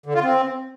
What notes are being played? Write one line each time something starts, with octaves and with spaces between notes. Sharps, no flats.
D3
F4
C4